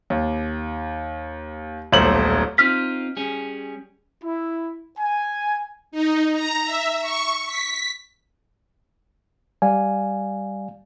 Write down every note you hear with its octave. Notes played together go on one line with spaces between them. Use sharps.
D#2
D#1 B1 A3 C5 F#7
C4 D#4 F4 F6 B6
G3 C#4 G#4
E4
G#5
D#4
A#5
E5
C#6
B6
G3 D5 F5 G#5